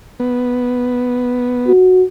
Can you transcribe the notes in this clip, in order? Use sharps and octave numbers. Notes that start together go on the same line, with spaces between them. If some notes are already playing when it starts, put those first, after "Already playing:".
B3
F#4